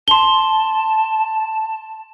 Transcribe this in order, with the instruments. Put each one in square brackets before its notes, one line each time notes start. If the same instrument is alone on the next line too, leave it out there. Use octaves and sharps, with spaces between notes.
[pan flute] A5 [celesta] C6 G7